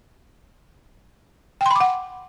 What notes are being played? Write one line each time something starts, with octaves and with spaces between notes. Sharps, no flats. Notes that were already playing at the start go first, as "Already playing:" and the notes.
F#5 G5 B5 C6 D6